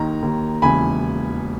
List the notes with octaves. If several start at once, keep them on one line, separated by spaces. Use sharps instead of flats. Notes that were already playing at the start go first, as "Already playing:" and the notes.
Already playing: D#2 D#3 A#5
D#2 D#3
E1 D#2 C#3 E3 G#5 B5